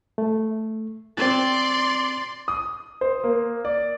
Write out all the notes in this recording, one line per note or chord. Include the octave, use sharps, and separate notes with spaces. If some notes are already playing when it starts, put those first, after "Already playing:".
A3
C4 D5 C6 A6
D#6
C5
A#3
D5